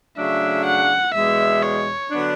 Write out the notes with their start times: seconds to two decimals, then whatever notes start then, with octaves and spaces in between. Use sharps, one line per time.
0.18 C#3 F#3 A3 D4 E5
0.66 F#5
1.14 E2 B2 G#3 E5
1.62 C#5
2.11 D3 F#3 B3 D4